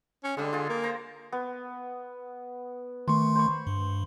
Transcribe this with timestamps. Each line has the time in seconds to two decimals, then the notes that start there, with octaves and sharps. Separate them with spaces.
0.24 C#4
0.37 D3 G3 G#3
0.53 F4 G#4 G5
0.69 A#3
0.83 C5 A#5
1.32 B3
3.08 D#3 A3 C6 C#6
3.36 C5 B5 C#6
3.67 G2